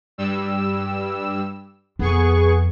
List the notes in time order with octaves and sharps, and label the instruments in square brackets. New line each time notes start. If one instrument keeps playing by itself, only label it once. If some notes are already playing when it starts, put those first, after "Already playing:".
[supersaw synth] G2 G3 E6
[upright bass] F2 [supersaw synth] B3 G#4 C#6